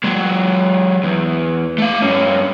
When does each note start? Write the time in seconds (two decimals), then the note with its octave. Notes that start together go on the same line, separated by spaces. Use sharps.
0.04 F#3 G#3
1.03 E2
1.78 A3 F5
2.02 G2 C#4